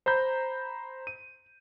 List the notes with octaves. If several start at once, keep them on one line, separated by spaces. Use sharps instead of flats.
C5 A#5 B5 G6
D#7